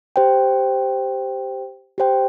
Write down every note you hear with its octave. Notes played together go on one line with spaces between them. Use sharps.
G4 C5 G5
G4 C5 G5